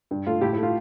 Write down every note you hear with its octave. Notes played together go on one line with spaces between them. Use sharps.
G2
A3 F4
A2 E4 G4
E4
A3
F4